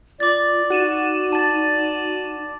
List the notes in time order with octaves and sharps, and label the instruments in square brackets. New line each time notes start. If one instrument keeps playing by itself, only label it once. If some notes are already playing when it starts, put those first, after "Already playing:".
[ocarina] F4 [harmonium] D5 [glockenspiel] D6 A6
[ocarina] D#4 [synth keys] F#4 D#7 E7
[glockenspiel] A5 A6